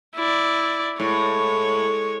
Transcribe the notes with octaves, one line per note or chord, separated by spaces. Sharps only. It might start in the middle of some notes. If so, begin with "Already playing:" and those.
E4 D5
A2 G#3 C#5